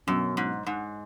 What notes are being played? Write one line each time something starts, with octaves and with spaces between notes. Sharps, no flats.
F#2 B2 F#3 C#4
G#2
G#2